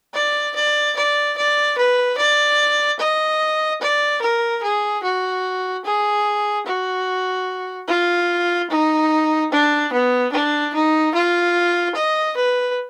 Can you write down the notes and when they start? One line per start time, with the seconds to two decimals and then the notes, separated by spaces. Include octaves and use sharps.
0.14 D5
0.55 D5
0.96 D5
1.37 D5
1.77 B4
2.17 D5
2.99 D#5
3.81 D5
4.22 A#4
4.63 G#4
5.03 F#4
5.85 G#4
6.66 F#4
7.88 F4
8.70 D#4
9.52 D4
9.92 B3
10.32 D4
10.74 D#4
11.14 F4
11.95 D#5
12.36 B4